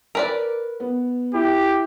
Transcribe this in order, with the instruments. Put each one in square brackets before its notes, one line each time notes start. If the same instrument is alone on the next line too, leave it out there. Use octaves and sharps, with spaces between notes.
[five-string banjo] A#4 B4 D5
[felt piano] B3
[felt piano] E4 [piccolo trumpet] G4